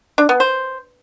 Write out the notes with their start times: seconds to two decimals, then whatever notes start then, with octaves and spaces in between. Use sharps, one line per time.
0.18 D4
0.29 B3
0.40 C5